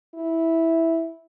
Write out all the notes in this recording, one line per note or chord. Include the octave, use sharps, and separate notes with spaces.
E4